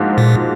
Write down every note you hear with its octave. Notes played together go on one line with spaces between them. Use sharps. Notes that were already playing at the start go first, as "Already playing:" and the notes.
Already playing: G#2 F3 A#3 D#4 F#4
A#2